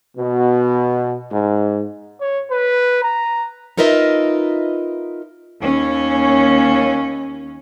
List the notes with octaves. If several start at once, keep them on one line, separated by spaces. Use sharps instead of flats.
B2
G#2
C#5
B4
A#5
D#4 F4 A#4 B4 D#5 E5
D#2 C#4